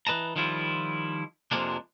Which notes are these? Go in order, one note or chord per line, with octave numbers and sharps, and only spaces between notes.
E3 B4 D#5 A5 A#5
D#3 F3 G3 E4 F4
F2 C3 F3 G#3 A#3 D4